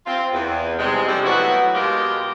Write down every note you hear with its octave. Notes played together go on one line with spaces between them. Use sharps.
C4 F4
E2
G#2 C3 G3 G#3
F3 G3 C#4 D4 A4 C5
A2 F#3 B3 E4 F#4
B2 G#3 F4 G4 G#4 A#4